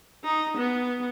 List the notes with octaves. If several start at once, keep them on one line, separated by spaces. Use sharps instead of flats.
D#4
B3